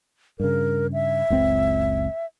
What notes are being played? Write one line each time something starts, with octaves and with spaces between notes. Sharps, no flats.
G2 C#3 A#4
E5
F#1 C#2 C4